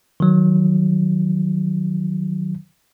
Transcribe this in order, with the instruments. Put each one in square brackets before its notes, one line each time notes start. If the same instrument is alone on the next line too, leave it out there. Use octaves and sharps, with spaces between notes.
[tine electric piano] D#3 F#3